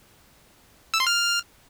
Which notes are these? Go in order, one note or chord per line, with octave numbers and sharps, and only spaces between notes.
E6
C6
F6